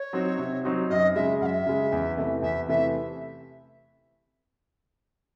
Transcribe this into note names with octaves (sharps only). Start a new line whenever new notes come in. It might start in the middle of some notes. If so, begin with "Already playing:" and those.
Already playing: C#5
F#3 C4 D#4 F#4
C3
F#3 C4 D#4 F#4
F#2 D#5
C#3 G#3 E5
F#2 E5 F#5
C#3 G#3
E2
C3 E3 A3
E2 E5
C3 E3 A3 E5